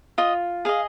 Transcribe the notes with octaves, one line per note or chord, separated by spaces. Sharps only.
F4 D#5
G#4 D#5 F5